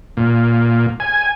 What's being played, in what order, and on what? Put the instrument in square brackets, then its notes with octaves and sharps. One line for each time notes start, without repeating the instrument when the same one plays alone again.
[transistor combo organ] A#2
G#5